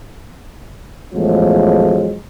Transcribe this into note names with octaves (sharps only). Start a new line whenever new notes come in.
A1 E2 A2 F3 F#3 G#3